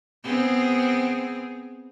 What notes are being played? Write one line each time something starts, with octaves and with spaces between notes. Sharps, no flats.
B3 C4 G#4